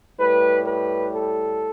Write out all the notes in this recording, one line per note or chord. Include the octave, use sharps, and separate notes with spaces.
A2 G3 B4
B4
A4